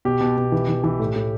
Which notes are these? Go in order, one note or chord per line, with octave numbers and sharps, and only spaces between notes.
B2 G4
B2
B2
E3
E3
E3
A2
A2